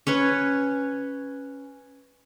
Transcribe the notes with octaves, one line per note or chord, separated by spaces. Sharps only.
C#4 B4 C#5